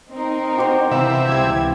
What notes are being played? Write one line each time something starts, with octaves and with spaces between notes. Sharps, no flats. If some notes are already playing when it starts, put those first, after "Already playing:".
C4 D#4 A#4
F#4 G4 C5
C3 E3 E5 F5 B5
C#2 E3 G3 G4 G#6